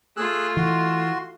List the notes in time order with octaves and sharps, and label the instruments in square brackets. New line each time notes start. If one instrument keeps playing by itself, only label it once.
[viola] A3 F4 [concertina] G#4 E6 F#6
[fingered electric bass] E3 [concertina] F#4 C6